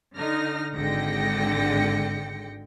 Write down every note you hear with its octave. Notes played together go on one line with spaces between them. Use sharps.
D3 D#4 F6 A#6
G#1 D3 G#3 G5 A#6 C#7